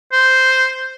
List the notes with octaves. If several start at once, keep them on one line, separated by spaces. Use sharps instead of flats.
C5